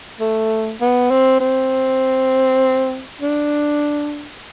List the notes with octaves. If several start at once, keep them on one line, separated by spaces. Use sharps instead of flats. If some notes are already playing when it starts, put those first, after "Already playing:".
A3
B3
C4
C4
D4